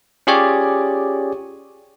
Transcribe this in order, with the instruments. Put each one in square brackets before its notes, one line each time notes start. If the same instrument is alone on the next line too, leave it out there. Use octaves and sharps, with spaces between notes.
[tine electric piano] C#4 F4 G4 G#4 C#5 D5